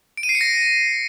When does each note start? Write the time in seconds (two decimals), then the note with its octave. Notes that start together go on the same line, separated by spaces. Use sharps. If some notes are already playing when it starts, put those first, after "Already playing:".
0.17 D7
0.23 D#7
0.29 C7
0.35 C#7
0.41 A#6